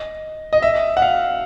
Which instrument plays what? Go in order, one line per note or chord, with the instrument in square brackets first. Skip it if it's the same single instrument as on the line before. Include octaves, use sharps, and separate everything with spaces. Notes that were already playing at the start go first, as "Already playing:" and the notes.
Already playing: [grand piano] D#5
D#5
E5
F#5
F5